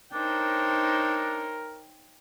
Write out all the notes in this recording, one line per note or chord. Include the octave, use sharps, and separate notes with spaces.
D4 D#4 A#4 C5 C#5 G5